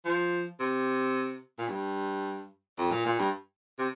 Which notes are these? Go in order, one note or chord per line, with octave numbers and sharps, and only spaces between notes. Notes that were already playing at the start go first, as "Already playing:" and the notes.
F3
C3
A#2
G2
F2
A#2
A#2
G2
C3